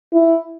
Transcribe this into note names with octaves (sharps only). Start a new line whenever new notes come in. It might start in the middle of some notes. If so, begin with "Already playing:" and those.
E4